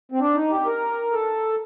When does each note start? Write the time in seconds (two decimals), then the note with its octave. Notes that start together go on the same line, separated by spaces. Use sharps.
0.12 C4
0.20 D4
0.35 D#4
0.51 G4
0.66 A#4
1.12 A4